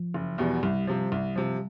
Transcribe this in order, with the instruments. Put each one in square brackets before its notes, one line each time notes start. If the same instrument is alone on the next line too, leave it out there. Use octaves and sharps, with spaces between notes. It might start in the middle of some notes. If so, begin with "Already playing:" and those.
Already playing: [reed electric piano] F3
[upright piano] F#1
E2 B2 G3 B3
[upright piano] C2 [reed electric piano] G3
[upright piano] C3 F3
C2
C3 F3